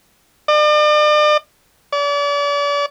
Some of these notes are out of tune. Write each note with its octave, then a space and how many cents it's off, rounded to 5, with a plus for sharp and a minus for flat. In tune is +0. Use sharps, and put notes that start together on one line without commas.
D5 +40
D5 -40